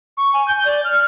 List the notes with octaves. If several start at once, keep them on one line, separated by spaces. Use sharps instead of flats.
C#6
G#5
G6
D5
F6